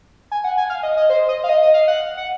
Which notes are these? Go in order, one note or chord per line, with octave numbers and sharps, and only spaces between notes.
G#5
F#5
G#5
F5
D#5
D#5
C5
D#5
F5
D#5
D#5
F5
F#5
F#5